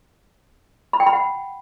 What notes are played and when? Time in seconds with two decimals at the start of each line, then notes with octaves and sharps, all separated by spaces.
0.93 B5
1.00 G5
1.07 B5
1.13 F#5